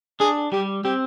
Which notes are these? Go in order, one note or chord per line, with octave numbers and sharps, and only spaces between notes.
D4 G#4
G3 G4
C4 G4